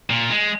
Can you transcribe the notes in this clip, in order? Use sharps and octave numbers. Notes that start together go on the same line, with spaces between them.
A#2
G#3